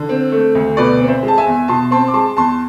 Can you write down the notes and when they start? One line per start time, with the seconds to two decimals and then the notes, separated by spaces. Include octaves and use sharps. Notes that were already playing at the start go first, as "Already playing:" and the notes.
Already playing: D3
0.09 C4
0.32 A3
0.55 D2
0.77 B2 B4 D5
1.00 C4
1.08 C5 E5
1.23 G#3
1.28 A5
1.38 E5 G#5
1.47 E2
1.68 B2 A5 C6
1.91 C4 A5 C6
2.08 D6
2.14 G#3 A5 C6
2.37 E2 A5 C6